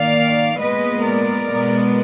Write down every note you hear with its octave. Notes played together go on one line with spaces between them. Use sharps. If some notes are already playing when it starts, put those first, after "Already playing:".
Already playing: D#3 A#3 D5 F5
A#2 G#3 B3 B4 D#5
A#4 D5
B2 G#3 B3